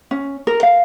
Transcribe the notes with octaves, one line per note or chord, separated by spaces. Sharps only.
C#4
A#4
F5